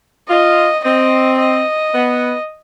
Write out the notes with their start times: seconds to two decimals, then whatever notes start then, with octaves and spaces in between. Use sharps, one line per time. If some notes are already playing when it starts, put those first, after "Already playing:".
0.29 F4 D#5
0.84 C4 D#5
1.39 D#5
1.94 B3